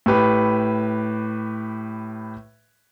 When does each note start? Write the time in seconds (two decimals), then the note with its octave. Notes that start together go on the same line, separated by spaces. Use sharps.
0.06 A2 G4 B4 B5